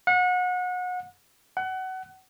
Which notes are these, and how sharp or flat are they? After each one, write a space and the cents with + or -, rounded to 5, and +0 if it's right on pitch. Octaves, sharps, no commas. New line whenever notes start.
F#5 -30
F#5 +25